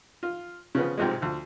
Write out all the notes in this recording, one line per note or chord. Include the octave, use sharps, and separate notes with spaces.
F4
C#3 F3 B3
B1 G#2 C3 F3 G#3
D2 F3